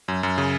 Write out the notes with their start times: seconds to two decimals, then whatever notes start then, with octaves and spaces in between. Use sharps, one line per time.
0.08 F#2
0.23 F#2
0.38 C#3